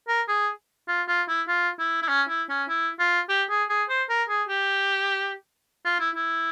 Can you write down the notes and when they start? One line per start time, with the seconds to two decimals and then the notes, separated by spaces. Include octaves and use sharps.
0.08 A#4
0.28 G#4
0.88 F4
1.08 F4
1.28 E4
1.48 F4
1.79 E4
2.03 E4
2.09 C#4
2.29 E4
2.50 C#4
2.69 E4
2.99 F4
3.29 G4
3.50 G#4
3.70 G#4
3.89 C5
4.09 A#4
4.29 G#4
4.49 G4
5.85 F4
6.00 E4
6.16 E4